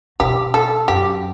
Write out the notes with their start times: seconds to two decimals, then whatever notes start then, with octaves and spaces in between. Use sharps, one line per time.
0.20 B2 G4
0.54 A4
0.88 F#2 G4